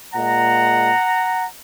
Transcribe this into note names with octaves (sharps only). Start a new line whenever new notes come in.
A#2 G#3 F#5 A#5